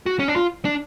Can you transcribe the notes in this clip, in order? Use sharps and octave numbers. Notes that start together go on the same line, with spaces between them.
F#4
C#4
D4
F4
D4